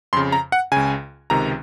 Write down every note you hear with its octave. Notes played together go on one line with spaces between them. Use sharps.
F2 C#3 C6
A#5
F#5
C#2 C#3 G#5
C#2 C3 D#3 A#5